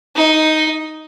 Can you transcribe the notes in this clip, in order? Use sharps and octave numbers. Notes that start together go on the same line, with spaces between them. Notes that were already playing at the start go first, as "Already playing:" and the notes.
D#4